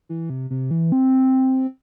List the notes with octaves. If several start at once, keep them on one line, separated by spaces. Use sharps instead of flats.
E3
C3
C3
E3
C4